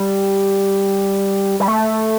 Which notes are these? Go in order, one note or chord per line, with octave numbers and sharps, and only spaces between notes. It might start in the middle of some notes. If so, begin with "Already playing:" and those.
Already playing: G3
G3
A3